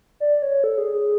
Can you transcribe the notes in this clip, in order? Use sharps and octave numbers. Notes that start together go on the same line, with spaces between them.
D5
C#5
A4
G#4
G#4